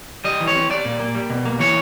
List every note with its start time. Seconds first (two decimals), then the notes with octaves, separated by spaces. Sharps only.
0.24 G3 D#5
0.40 E3
0.48 C#5
0.55 C4
0.70 G3 D5
0.85 A#2
1.00 A#3
1.15 G3
1.30 B2
1.45 A#3
1.60 E3 C#5